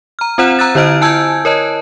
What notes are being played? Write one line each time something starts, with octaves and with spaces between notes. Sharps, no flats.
A#5 F6
C4 F4 C5 F#5 F#6 E7
A#5 E6 F#6 A6
D3 E4 C5 D#5 F6 D7
E4 G#5 A5 E6 G6 G#6
A#4 C#5 D#5 A5